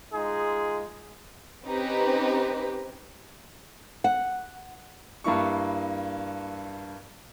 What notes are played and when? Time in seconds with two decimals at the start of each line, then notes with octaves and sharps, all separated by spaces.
0.12 G#3 D#4 F4 G#4
1.66 C4 C#4 D#4 G4 B4
4.04 F#5
5.24 G2 A#3 E4 C#6